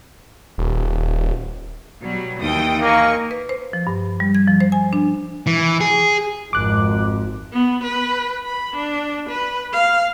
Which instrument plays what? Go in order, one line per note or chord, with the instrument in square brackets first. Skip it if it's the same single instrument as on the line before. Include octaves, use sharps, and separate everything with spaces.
[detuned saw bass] D#1
[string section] B2 G3 [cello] F#3
[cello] D#2 E3 [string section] G5 D#6
[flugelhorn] A#3 [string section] D#5 G#5 C#6
[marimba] B4
C5
F3
G2
G3
G#6
F3
C5
G#5
D4
[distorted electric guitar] E3
G#4
[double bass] G#1 F2 [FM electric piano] D6 F#6
[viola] B3
B4
B5
D4
B4
F5